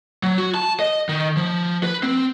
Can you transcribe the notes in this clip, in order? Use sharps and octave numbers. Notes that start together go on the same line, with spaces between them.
F#3
F#4
A5
D#5
D#3
F3
B4
C4